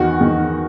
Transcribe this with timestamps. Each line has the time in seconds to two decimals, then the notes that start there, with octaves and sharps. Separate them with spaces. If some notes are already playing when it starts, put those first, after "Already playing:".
Already playing: E2 D#3 F#4
0.20 E2 D#3